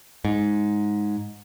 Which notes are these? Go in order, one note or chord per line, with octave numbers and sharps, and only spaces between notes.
G#2